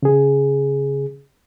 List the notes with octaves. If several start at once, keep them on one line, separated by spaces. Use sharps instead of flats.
C#3 G#4